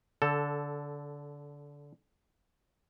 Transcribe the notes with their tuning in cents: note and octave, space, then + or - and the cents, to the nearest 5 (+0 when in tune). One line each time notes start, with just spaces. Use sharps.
D3 -20 A4 +5